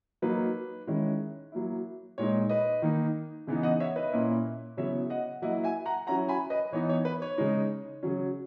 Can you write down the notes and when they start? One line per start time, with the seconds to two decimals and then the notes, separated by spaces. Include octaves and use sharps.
0.22 F#3 A#3 D#4 B4
0.87 D#3 G#3 C#4 E4
1.52 F#3 A#3 E4
2.18 A#2 G#3 D#4 C#5
2.49 B4 D#5
2.82 D#3 A#3 D#4
3.47 C#3 E3 B3 D#4
3.63 D#5 F#5
3.80 C#5 E5
3.96 B4 D#5
4.12 A#2 A#3 C#4 E4
4.77 C#3 F#3 B3 E4 C#5 E5
5.10 D#5 F#5
5.42 F#3 A#3 E4 D#5 F#5
5.64 E5 G#5
5.86 F#5 A#5
6.07 F#3 C#4 E4 F#5 A#5
6.29 G#5 B5
6.50 B4 D#5
6.72 E3 B3 D#4 C#5
6.89 C#5
7.05 B4
7.22 C#5
7.38 C#3 G#3 D#4
8.03 C#3 F#3 C#4